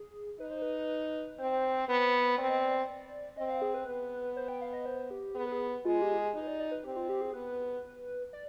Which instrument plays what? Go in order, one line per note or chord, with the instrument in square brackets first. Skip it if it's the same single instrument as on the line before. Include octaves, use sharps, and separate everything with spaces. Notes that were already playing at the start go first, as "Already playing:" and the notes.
Already playing: [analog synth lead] G#4
[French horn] D#4 [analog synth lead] B4
[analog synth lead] C5
B4
[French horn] C4 [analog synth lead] C5
[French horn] B3
[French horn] C4 [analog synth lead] D5
[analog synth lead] D#5
D5
[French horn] C4 [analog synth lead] D#5
[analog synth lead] F5
G#4
B4
[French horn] B3
[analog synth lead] C5
G5
F5
D#5
C5
G4
[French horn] B3 [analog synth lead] G#4
[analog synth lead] B4
G#4
[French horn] G#3 [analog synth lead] F4
[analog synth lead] G4
G#4
[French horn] D#4 [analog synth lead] B4
[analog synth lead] D5
D5
B4
[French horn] C4 [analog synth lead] G4
[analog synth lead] F4
G4
G#4
[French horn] B3 [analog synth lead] B4
[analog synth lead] D5